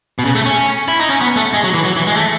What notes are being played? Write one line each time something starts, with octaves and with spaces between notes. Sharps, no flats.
B2
C#3
A3
C#4
E4
D#4
C#4
B3
A3
G#3
F#3
E3
F#3
E3
G#3
A3